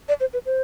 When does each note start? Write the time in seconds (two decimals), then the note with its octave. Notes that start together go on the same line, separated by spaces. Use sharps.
0.08 D5
0.20 C5
0.33 B4
0.46 C5